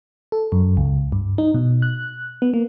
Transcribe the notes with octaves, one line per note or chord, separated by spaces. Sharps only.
A4
F#2
C#2
G2
D#4
B2
F#6
B3
A#3